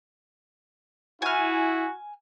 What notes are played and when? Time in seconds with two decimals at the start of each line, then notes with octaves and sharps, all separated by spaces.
1.22 E4 F#4 G#5 F6